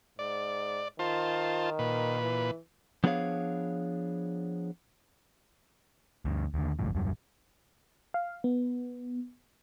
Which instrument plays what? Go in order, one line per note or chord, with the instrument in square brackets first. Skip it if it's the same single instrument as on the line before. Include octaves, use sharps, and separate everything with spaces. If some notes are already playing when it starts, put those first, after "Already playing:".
[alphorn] G#2 [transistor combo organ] D5
[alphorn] D#3 [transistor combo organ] F4 C5 A5
[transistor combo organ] A#2 B4
[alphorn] E3
[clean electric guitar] F3 B3 D4 G#4 C#5 F5
[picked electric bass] D2 G2
D#2 D3
G1 C2 F2 A2
D#1 F#2 G3
[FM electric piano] F5
B3